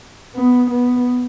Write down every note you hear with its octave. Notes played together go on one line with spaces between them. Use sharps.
B3
B3